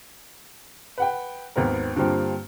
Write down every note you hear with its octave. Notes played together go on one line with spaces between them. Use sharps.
B4 F#5 G5
G#1 D#2 B3 C4 A#4
G2 D3 G3 A#3 C4 F4